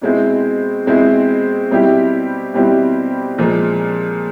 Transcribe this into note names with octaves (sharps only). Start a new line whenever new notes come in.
B2 G#3 C4 E4
B2 G#3 C4 E4
B2 G3 C4 E4 G4
B2 G3 C4 E4 G4
A#2 F3 G#3